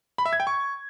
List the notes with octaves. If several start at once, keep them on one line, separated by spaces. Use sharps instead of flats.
B5
E5
G#6
G5
C#6